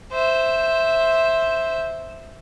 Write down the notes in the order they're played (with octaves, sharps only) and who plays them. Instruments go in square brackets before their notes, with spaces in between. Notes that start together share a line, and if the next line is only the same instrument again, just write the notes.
[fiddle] C5 E5